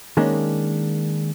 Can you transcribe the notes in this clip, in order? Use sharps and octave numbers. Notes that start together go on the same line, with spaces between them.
D#3 G#3 A#3 C#4 D4